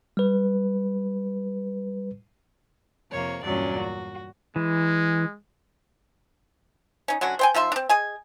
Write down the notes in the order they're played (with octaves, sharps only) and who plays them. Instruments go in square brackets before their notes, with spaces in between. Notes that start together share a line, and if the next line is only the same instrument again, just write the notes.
[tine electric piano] G3 B4
[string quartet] F2 C3 A#3 C#5
E2 G2 A#2 F#3 C#4 D5
F#4
[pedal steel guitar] E3 [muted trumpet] G#3
[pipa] C#4 D#4
D3 F#3 C#4 F#4
C5 G5 G#5
F3 D#4 E5 C6
C4 D4
G#4 D#5 G#5